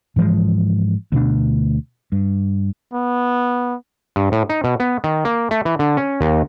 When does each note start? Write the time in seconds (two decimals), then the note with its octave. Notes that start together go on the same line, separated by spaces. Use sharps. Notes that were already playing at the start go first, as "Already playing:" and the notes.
0.16 G#2 E3 F3 G#3
1.12 D2 B2 D4
2.12 G2
2.93 B3
4.16 G2
4.32 A2
4.49 D#4
4.64 B2
4.80 B3
5.04 D#3
5.25 A#3
5.51 A3
5.65 E3
5.79 D3
5.97 C#4
6.21 D#2